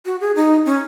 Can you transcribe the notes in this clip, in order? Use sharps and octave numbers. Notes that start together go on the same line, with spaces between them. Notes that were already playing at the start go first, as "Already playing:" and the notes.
F#4
G#4
D#4
C#4